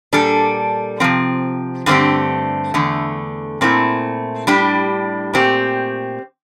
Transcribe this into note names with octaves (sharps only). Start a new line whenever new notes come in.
A#2 G3 D4 A4
C3 F3 C4
G2 D3 A3 C4 G4
E2 D3 A3
A#2 A3 C4 E4
A2 G3 D4 G4
A#2 A3 C4 G4